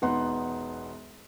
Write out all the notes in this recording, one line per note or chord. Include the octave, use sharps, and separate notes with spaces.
E1 B3 D#4 F#5 C6